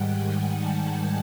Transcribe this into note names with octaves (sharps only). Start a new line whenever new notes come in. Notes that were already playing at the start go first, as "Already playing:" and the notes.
Already playing: G#2 D#3 G3 F#5 G5
G#5
A5